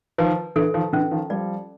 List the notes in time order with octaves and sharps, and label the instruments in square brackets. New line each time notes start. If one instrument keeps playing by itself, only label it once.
[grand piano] D#3 F3 [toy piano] B4
[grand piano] D3 E3 [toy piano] A4
[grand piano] D#3 F3
[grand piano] D3 E3 [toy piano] C#4
[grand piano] D#3 F3
[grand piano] F3 G3 [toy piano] D5